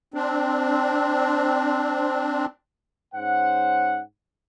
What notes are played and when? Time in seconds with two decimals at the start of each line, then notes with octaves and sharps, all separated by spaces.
0.14 C4 D4
3.14 G#2 C#4 C5 F#5